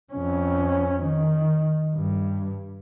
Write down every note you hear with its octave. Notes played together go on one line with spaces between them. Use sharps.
F2 C#4
D#3
G2